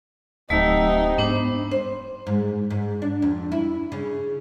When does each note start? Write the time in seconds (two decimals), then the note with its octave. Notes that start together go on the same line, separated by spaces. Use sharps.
0.50 D1 C3 F#3 A3 D#4 E6
1.18 G#2 B3 D4 C5
1.71 C5
2.27 G#2
2.71 G#2
3.02 D4
3.22 F2
3.52 E4
3.92 C#3